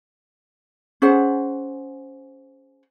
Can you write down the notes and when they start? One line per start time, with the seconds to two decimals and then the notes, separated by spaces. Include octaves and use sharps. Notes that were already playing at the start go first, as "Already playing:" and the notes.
1.02 C#4 G#4 C5 F#5